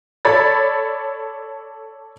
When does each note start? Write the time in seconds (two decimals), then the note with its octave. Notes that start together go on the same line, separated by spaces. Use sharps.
0.25 A4 C#5 D5 B5 A6